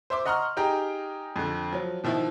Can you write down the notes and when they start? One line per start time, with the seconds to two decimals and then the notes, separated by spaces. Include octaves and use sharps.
0.10 C5 E5 C6 D6
0.26 D#5 F#5 A#5 C6 C#6 F6
0.57 D#4 G4 G#4 G5 A#5
1.36 F2 D3
1.73 F3 F#3
2.04 B2 D#3 F3 E4